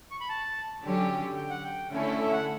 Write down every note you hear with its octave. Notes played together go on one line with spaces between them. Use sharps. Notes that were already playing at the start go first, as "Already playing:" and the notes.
C#6
B5
A5
D3 F#3 C#4 G4
G5
F#5
G5
D3 A3 C#4 E4 A4
E5
F#5